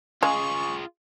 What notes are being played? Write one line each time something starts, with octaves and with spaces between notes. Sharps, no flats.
C#3 G#3 F4 G#4 C#6